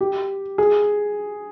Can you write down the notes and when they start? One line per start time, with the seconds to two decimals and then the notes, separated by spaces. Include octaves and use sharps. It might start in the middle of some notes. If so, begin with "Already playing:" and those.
0.01 G4
0.58 G#4